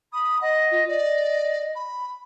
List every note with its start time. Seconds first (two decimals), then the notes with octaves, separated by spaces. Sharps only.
0.13 B5 D#6
0.41 D#5 F#5
0.71 F4
0.88 D5 D#5
1.76 B5